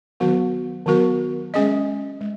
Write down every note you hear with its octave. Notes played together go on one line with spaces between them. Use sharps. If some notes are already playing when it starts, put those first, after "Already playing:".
D#3 F#3 B3 F#4 A#4
D#3 F#3 B3 F#4 A#4
G#3 C#4 G#4 D#5
G#3